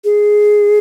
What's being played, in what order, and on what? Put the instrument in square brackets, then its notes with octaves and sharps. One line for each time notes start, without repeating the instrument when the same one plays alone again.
[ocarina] G#4